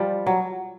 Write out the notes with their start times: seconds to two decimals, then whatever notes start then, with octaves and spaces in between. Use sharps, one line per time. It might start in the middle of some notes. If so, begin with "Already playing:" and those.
Already playing: F3 G3
0.26 F#3